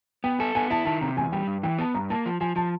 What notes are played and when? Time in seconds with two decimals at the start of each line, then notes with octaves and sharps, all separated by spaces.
0.24 B3 G5
0.39 A4 G#5
0.55 B3 G#5
0.70 E4 A5
0.85 D#3 A5
1.01 C3 A#5
1.17 E2 G#5
1.32 G3 G5
1.47 G2
1.63 E3 G5
1.79 B3 A5
1.94 G2 A#5
2.10 A#3 A5
2.26 F3
2.41 F3 G#5
2.56 F3 A5